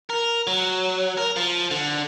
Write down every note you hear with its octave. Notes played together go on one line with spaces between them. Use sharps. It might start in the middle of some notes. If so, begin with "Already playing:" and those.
A#4
F#3
A#4
F3
D3